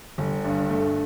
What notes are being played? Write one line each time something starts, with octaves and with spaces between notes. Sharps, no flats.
G1
G2
A3